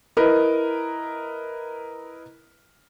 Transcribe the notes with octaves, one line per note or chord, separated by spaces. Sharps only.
E4 A#4 B4 D#5